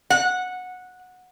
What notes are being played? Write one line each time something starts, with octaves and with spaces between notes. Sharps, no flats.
F#5